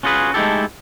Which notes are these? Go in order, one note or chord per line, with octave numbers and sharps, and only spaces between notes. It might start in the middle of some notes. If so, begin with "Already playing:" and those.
C#4 F4 F#4 G#4 B4
G#3 A3 D#4 E4 G4 A4